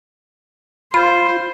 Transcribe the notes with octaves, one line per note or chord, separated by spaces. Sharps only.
F4 C5 B5